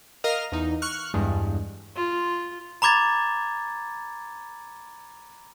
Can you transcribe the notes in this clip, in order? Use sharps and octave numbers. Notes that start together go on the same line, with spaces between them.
A#4 D#5 F5 F6
E2 D#4
C#6 F6 F#6
E2 G2 G#3
F4
A#5 B5 D6 G#6 A6